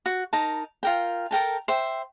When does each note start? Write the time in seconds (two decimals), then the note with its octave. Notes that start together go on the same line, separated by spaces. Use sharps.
0.06 F#4
0.33 D#4 A#4 A5
0.83 F4 A#4 G5
1.31 A4 A#4 G5 A5
1.68 C5 E5 G5